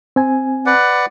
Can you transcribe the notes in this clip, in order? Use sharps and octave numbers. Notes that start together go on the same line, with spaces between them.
C4 G#5
B4 D5 F#5